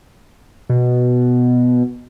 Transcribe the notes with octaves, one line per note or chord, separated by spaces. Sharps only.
B2